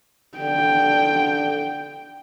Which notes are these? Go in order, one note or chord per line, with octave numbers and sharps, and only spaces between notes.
D3 G5